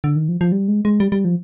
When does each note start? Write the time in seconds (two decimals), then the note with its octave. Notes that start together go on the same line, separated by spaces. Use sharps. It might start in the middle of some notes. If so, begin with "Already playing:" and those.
0.04 D3
0.16 D#3
0.29 F3
0.41 F3
0.52 G3
0.68 G#3
0.85 G#3
1.00 G3
1.12 G3
1.25 F3